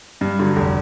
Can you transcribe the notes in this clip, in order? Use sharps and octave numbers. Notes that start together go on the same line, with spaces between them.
G2
D3 F#3
F1